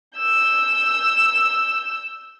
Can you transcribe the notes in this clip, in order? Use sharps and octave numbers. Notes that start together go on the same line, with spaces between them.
E6 G6